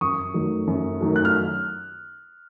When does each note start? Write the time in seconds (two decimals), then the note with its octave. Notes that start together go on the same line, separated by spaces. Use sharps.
0.01 F#2 C#6 D#6
0.34 D#3 F#3 A3
0.67 F#2
1.01 D#3 F#3 A3
1.16 F#6
1.25 F6